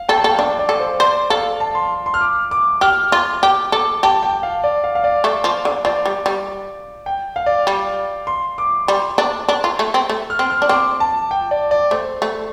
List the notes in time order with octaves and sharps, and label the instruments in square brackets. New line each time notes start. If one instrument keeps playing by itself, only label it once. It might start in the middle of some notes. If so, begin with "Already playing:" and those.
Already playing: [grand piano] F5
[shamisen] A4 [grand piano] G5
[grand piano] A5
[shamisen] A4
[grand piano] G5
[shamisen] D4 [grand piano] D5
[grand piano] D5
[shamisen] A4
[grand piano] C5
[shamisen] C5 [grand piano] D5
[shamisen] A4 [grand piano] F5
[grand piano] A5
C6
C6
F6
D6
D6
[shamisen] G4 [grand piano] F6
[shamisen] F4
[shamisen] G4 [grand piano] D6
[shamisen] A4 [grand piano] D6
[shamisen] G4 [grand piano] A5
[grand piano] G5
F5
D5
F5
F5
D5
[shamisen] A3
F3
D3
[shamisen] F3 [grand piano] D5
[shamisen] G3
G3
[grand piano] G5
F5
D5
[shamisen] G3
[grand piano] C6
D6
[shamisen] G3 [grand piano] C6
[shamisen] D4
D4
F4
A3
C4
A3
[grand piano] F6
[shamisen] C4
[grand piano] F6
[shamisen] D4
[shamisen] C4 [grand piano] D6
[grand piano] A5
G5
D5
D5
[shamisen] A3 [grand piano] C5
[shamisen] A3